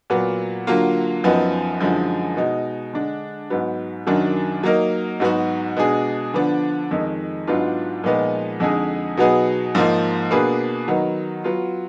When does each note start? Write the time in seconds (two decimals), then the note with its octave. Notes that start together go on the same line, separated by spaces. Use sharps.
0.10 A#2 F#3 B3
0.67 D3 F#3 A#3 F4
1.24 F#2 F3 B3 D#4
1.80 F#2 D3 F3 G#3 D#4
2.37 B2 G#3 D#4
2.93 D3 G#3 D4
3.50 G#2 F#3 B3
4.07 F#2 D#3 F#3 D4
4.63 F#3 A#3 D#4 A#4
5.20 G#2 F#3 B3 D#4 F#4
5.77 B2 G#3 D4 G#4
6.34 D3 F3 B3 D4
6.91 F2 D#3 G#3 D#4
7.47 G#2 F#3 B3 D4 F4
8.04 A#2 F3 G#3 B3 D#4
8.60 F2 D3 G#3 D#4 G#4
9.17 B2 F#3 B3 D#4 G#4
9.75 G#2 F3 A#3 D#4
10.30 B2 A#3 D4 G#4 B4
10.88 D#3 F#3 B3 D#4
11.44 F#3 B3 F4